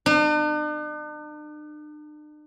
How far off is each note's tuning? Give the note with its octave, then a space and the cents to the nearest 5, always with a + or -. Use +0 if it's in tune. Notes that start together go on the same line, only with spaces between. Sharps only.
D4 +45